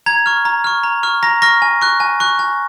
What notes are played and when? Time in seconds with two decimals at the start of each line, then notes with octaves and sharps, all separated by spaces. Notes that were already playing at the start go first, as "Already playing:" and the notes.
0.06 A#5 G#6
0.26 C#6 F6
0.45 A#5
0.64 C#6 F6
0.83 A#5
1.03 C#6 F6
1.23 A#5 A#6
1.42 C#6 F6 A#6
1.62 G#5
1.82 C#6 F#6
2.00 G#5
2.20 C#6 F#6
2.39 G#5